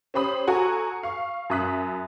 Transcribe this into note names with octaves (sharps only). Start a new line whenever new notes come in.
C#4 G4 C5 B5 D#6
F#4 A4 F#5 G#5 A#5 C#6
F5 C#6
F#2 E5 D#6 F#6 B6